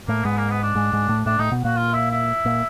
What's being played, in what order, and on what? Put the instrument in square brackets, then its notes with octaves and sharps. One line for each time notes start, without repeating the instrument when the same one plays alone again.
[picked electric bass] A2 A3 [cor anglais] A#3
[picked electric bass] G#2 G#3 [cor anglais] B3
[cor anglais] A#3
B3
D4
[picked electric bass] G#2 G#3
G#2 G#3
A2 A3
[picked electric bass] A2 A3 [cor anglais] D4
[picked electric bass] A2 A3 [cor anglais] D#4
[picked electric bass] B2 B3
[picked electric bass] A#2 A#3 [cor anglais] F#4
[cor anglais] F4
E4
E4
[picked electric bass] A#2 A#3